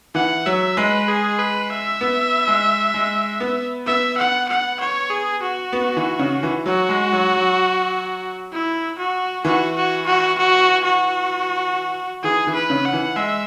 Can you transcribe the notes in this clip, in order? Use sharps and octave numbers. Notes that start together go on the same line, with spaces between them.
E3 F#5
F#3 E5
G#3 B4
G#4
B4
E5
B3
G#3
G#3
B3
B3 E5
F#5
F#5
C#5
G#4
F#4
B3
E3
C#3
E3
F#3 F#4
G#3
F#3
F#3
E4
F#4
E3 F#4
F#4
F#4
F#4
F#4
E3 G#4
E3
B4
C#3
F#5
E3
G#3 E5